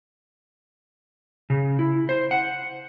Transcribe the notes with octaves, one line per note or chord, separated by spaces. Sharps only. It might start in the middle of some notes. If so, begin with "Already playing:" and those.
C#3
E4
C5
F#5